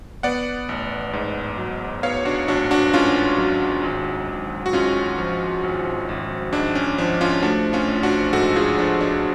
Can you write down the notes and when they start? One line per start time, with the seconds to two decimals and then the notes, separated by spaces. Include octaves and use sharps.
0.23 B3 D5 F#5
0.69 A1
1.13 G#2
1.58 F#3
2.03 B3 C#5 F5
2.25 D4 F#4
2.48 A1 D4 F#4
2.71 D4 F#4
2.94 G#2 C#4 F4
3.38 F#3
3.83 G#1
4.28 G#1
4.66 F#4
4.73 G#2 C#4 F4
5.18 F3
5.63 G#1
6.09 G#1
6.53 G#2 D4
6.75 C#4
6.98 F3 D4
7.21 C#4 F4
7.43 A3 D4 F#4
7.73 C#4 F4
7.88 A1
8.03 D4 F#4
8.33 G#2 F#4 A4
8.56 F4 G#4
8.77 F3 D4
9.01 D4